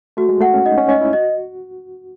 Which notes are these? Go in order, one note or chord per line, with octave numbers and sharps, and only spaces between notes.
A3 F#4
G#3
A3 F#5
C#4
D#4 D#5
C#4
C#4 D#5
E4
F#4 D#5